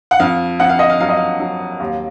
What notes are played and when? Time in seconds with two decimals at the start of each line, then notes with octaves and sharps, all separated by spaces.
0.11 F#5
0.19 F2 F5
0.60 F2 F#5
0.69 F5
0.79 D#5
0.90 F5
1.00 F#3 F5
1.09 D#5
1.17 F5
1.40 F#3
1.80 D#2